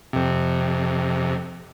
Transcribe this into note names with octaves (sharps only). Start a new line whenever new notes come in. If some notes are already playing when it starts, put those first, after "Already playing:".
F2 C3